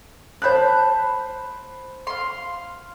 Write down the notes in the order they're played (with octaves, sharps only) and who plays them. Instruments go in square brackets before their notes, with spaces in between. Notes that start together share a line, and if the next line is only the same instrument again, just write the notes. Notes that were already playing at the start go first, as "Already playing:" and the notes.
[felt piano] C5 B5 F#6 [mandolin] A5 G6
[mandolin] F5 C6